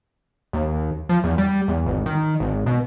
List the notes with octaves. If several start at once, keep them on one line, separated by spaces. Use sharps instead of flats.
D#2
F3
E2
G3
E2
G#1
D#3
G#1
B2